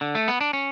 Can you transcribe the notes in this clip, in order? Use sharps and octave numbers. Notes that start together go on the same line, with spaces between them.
D3
A3
B3
D4
C#4